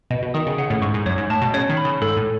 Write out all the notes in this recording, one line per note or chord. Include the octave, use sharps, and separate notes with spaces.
B2 D#5
B2
D#3 D#6
C#3
C#3 F#5
A2
G#2 C#6
G#2
F#2 C#5
G#2
A2 A5
B2
C#3 C#5
D#3
B5
C#3
G#2 A4
A2